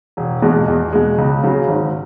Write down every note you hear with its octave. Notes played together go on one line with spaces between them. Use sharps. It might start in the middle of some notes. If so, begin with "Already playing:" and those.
E1
E2 B2 G#3
E2
B2 G#3
C#2
C#3 F#3
G#1